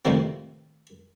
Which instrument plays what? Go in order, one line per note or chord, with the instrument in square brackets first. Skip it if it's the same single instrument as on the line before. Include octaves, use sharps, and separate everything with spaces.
[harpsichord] D2 A2 C3 D#3 F3 C4